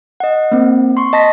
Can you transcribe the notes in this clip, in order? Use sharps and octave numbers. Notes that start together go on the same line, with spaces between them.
D#5 F#5
A#3 C4
C6 C#6
D#5 A5 A#6 B6